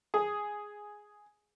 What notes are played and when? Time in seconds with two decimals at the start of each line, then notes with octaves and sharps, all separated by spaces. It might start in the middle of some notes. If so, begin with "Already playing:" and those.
0.14 G#4